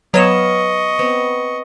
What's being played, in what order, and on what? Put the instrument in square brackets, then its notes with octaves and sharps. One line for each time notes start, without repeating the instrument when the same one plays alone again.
[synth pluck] F#3 C#5 E7 [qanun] B3 F5 [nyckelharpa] D#5 C#6
[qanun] B3 C4